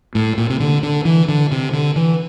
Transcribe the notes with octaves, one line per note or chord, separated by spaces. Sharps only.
A2
A#2
C3
D3
D3
E3
D3
C3
D3
E3